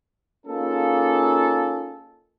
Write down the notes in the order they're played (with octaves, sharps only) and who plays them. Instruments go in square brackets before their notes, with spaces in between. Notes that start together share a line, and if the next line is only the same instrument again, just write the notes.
[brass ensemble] A#3 C#4 D#4 F4 G#4 A4